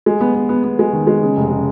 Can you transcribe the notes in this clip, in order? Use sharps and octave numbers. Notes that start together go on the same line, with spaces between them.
G#3
B3
B3
B3
B3
G#3
D#3
G#3
C#3
F1
C#3